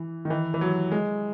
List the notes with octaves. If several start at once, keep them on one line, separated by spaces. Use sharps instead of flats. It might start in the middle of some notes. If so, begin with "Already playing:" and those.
Already playing: E3
D#3
E3
E3
F#3
G#3